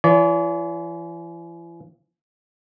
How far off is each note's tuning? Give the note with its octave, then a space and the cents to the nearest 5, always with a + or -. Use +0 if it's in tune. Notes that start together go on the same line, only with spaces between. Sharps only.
E3 +40 D5 -40